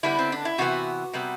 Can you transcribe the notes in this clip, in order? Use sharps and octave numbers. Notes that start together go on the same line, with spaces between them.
D3 G3 B3 E4
C4
D4
E4
C3 E3 B3 F#4
C3 G3 B3